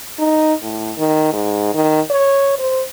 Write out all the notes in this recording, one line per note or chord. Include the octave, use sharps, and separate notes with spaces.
D#4
A2
D#3
G#2
D#3
C#5
C5